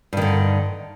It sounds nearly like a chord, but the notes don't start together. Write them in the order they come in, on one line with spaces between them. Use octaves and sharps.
G2 D#3 D3